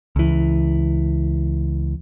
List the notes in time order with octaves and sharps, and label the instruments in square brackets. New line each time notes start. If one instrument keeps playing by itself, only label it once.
[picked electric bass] C#2 E3